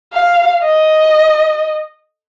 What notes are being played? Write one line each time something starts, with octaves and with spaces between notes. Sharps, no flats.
F5
D#5